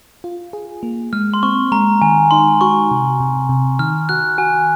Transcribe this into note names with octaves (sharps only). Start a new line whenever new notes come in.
F4
G#4
A#3
G#3 F6
C6
C4 C#6
G#3 A#5
D#3 G#5
D#4 C6
F#4 C#6
C3
C3
C3
D#3 F6
F#4 F#6
F#4 G#5